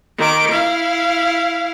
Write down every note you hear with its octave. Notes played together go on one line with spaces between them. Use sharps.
D#3 D6
E4 F5